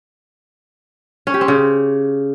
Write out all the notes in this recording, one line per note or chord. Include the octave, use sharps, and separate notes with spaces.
C#4
G4
C4
C#3